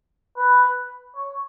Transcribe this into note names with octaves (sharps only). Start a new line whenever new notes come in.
B4
C#5